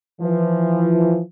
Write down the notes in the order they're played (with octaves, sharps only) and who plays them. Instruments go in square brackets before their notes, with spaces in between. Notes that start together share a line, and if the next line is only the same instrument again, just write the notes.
[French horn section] E3 F3